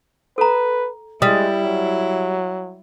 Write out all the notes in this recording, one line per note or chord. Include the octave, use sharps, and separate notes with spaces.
A4 B4 A#5
G3 G#3 E4 D#6
F#3